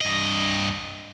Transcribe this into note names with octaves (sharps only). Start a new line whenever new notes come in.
G2 D#5